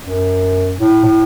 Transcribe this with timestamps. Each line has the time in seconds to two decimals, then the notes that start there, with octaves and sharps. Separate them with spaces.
0.03 F#2
0.79 A2
1.04 A2